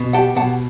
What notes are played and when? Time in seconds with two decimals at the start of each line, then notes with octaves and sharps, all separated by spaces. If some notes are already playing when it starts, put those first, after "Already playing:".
Already playing: B2
0.13 G4 F#5 A5
0.36 B2 F#5 A5